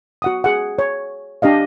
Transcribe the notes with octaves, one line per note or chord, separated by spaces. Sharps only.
F#4 F#5 D#6
G#4 F#5
C#5
D4 G4 D#5 F5